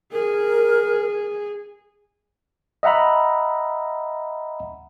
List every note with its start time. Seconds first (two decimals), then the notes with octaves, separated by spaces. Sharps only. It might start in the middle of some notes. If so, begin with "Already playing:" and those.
0.13 G#4 A#4
2.83 D#5 E5 F#5 A#5 B5